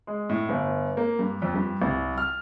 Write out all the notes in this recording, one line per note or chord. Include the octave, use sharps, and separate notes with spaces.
G#3
A2
G1
A#3
G2
F2
G2
C2
F6